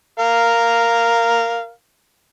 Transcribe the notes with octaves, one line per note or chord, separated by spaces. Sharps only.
A#4 F5